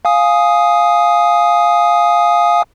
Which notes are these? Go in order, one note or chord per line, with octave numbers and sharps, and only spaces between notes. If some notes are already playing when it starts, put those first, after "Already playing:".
F5 G#5 D#6